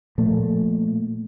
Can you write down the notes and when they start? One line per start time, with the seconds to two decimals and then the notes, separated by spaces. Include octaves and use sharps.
0.18 A#2 F3 A3